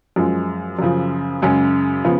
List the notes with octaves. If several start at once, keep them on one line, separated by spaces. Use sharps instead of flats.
F#2 F3 G#3
F#2 C#3 F3
F#2 C#3 G#3 C#4
C#3 F3 B3